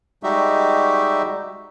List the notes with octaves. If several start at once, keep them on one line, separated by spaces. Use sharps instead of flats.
G3 G#3 D#4 F#4 G4 E5